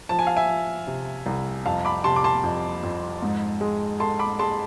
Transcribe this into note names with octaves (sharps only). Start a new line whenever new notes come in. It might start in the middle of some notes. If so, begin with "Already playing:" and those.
F3 A5
G#5
F5
E5 G#5
F3
C3
C2
F2 F5 A5
B5 D6
C3 A5 C6
D6
A5 C6
F2
F2
G#2
G#3
A4 A5 C6
B5 D6
G#3 A5 C6